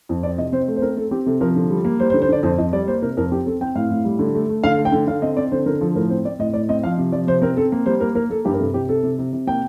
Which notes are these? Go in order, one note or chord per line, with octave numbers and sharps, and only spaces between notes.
F2
C4 D5
C3 D#5
C4 C5
A3
C5
C4 A#4
C4 A4
C4 G4
C3 A4
F3 A#4
D3
G3
A#3
G3 C5
C5
D3
C5
D3 D5
F2 C5
F2 D#5
G3 D5
A#3 C5
C3 A#4
F2 A#4
C4 G4
C4 A4
C4 G5
A2 F5
A2
G3
D3
A3
A3
D3 F5
A3
G5
D3
D3 F5
C4 D#5
C4 D5
D3 C5
D3 A#4
F3 A4
A2 A#4
C4 C5
C4 D5
A2 D#5
A2 D5
C4 D#5
F3 F5
C3
F3 D5
C3 C5
C4 A#4
C4 A4
A#3
G3 C5
A#3 A#4
A#3 A#4
A#3 A4
G2 G4
A#4
C3 A4
C3 G4
C3 A4
C3
C3
C3
A#3 G5